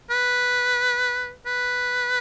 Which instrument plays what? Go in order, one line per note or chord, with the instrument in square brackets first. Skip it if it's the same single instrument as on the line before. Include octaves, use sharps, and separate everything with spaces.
[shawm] B4
B4